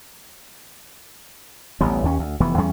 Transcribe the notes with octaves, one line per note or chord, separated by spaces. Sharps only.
A1 D2 G3 B3
D#2 C#4
D2
F1 E3 B3
E2 G3 C#4